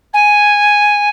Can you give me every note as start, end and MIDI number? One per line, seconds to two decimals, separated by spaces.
0.13 1.09 80